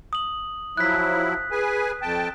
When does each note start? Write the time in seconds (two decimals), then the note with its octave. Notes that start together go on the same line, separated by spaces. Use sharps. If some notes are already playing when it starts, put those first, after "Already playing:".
0.13 D#6 F#7
0.77 F3 F#3 E4 F#6 B6
1.52 G#4 B4 G#5
2.02 F2 G5 A5